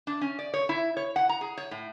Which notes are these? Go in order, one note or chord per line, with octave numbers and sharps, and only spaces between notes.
D4
C#4
D5
C#5
E4
C#5
F#5
A#5
G#4
C#5
A2